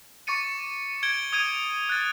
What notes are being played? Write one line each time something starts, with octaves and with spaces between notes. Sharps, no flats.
C#6 D6 A6 C#7 D#7
G#6 D7 G7
D#6 G#6 D#7
F#6 A6